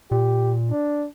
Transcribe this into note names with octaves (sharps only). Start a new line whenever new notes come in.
A#2 G4
D4